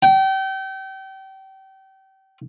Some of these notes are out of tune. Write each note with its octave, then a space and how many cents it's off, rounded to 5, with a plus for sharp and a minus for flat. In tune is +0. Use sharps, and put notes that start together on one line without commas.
G5 -30